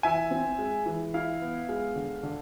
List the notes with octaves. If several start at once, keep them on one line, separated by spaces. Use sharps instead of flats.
E3 E5 G#5
C4
G#3
E3
E4 F5
B3
G#3
D3
D3